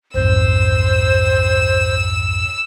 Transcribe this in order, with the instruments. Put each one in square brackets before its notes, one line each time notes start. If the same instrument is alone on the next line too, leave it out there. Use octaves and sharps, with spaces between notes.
[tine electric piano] B1 F2 G#2 [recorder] C5 [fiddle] E6